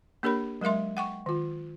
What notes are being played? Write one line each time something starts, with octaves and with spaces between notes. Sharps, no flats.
A#3 D4 G4 A#4 C#5 B5
F#3 G#3 A#4 E5 C6
F#5 G5 C#6
D#3 F4